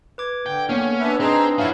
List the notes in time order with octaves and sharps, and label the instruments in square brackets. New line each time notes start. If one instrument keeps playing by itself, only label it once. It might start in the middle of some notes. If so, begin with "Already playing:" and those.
[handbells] B4 D6 G#6
[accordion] D3 [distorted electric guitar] G5
[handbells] A#3 B3 [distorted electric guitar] C#4
[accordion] D4 B4 E5
[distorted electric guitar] C4 [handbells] D4 B4 [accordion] D#4 G#4 A#5
[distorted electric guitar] C#4 F#4 [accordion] E4 F5